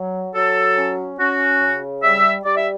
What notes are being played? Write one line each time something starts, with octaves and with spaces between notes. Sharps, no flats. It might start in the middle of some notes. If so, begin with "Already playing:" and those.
Already playing: F#3
F#3 A4
C#4
C#4 F#4
C#3
G3 E5
G3 D5
E5